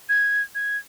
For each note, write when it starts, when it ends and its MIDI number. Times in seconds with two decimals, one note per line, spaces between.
0.09 0.42 92
0.55 0.77 92